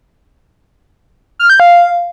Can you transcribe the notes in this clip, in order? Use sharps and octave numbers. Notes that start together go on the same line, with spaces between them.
F6
G6
F5